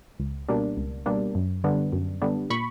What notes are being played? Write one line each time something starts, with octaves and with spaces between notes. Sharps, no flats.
C#2
B2 G3 A#3 D4
C#2
B2 G3 A#3 D4
F#2
D3 G3 B3 D4
F#2
D3 G3 B3 D4
A#2 B5 C#6